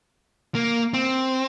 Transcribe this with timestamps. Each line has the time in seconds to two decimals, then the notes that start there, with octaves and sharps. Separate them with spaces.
0.55 A#3
0.94 C4